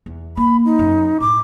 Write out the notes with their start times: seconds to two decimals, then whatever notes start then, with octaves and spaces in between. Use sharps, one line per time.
0.06 E2
0.37 A#3 B5
0.65 D#4
0.79 F#2
1.20 A2 D6